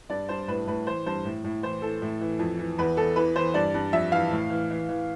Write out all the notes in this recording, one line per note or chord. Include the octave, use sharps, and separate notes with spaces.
G2 D5
G2 C5
A2 B4
A2 B4
E3 C5
G2 C5
A2
A2
E3 C5
E3 A4
A2
E3
F2
E3
E2 B4
E2 A4
E3 B4
E3 C5
G2 D5
G2
F2 E5
E3 F5
A2
E3
E3
E3